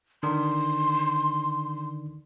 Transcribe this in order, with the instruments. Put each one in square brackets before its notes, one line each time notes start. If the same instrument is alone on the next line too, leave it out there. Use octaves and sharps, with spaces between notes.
[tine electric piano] D3 D#3 D4 [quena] C6